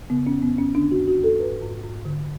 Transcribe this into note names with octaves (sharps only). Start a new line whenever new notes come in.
C#3 B3
C#4
F2
B3
F2 C#4
D3 D4
F#4
F2
F#4
F2 A4
G#2 B4
G#2
G#2
D3